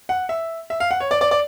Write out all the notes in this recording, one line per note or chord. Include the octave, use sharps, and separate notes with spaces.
F#5
E5
E5
F5
F#5
C#5
D5
D5
D5